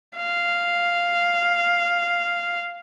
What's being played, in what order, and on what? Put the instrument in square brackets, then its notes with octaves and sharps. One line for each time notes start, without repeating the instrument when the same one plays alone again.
[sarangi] F5